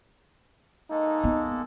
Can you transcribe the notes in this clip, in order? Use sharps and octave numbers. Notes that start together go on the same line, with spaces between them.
G#3 A#3 D#4 A4
B3